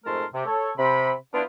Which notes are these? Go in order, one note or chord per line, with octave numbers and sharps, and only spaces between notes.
F2 G#2 A3 A#4 A5 C6
C3
A4 C#5
C3 B5
F3 B3 D4 E4 F4 C5